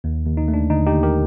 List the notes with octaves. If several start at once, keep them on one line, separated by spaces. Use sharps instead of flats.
D#2
D#2
D#4
A3
D4
D3 D#4
D#4 G4
D#2
G4 A#4